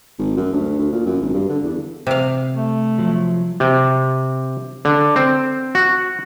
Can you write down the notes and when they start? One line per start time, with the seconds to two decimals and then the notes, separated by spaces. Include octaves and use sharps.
0.19 G#1
0.37 F#2
0.53 D2
0.79 D2
0.92 A#2
1.06 F#2
1.21 G#1
1.33 G2
1.49 D3
1.64 E2
2.07 C3 F5
2.54 A3
2.98 F3 F#3
3.60 C3
4.85 D3
5.16 C4
5.75 F#4